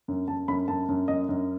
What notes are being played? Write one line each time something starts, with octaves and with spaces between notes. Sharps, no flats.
F#2
F#2 A5
F#2 B5
F#2 A5
F#2
F#2 D#5
F#2